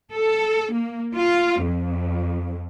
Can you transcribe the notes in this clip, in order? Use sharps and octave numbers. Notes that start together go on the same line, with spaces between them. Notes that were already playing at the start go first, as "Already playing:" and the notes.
A4
A#3
F4
F2